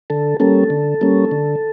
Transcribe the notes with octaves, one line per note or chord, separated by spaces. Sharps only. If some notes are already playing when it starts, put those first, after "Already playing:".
D3 A4
G3 A#3 C#4 A4
D3
G3 A#3 C#4
D3